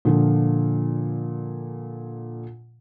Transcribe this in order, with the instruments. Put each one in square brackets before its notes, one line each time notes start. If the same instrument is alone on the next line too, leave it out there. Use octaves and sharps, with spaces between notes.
[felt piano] A#2 D3 F3